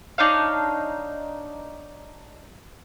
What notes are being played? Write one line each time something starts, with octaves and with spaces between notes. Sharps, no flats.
D4 D#4 C#5 F5